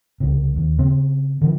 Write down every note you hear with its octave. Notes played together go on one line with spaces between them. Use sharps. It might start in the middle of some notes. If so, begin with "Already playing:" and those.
C#2 C3
D#2
C#3 C4
D3 E3 F3